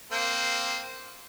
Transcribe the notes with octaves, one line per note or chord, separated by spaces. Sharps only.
A#3 C4